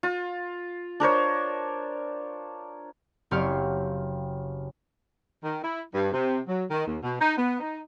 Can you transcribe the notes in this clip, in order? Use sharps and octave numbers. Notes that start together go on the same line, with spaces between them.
F4
D4 A#4 C5 C#5
F#1 C4 G4 C#5 F5 F6
D#3
E4
G2
C3
F#3
D#3
D#2
B2
D#4
B3
D#4